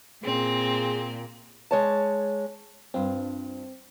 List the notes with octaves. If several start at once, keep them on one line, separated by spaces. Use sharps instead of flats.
A#2 C4 G#4
G#3 C#5 A5
G2 C4 D4 F4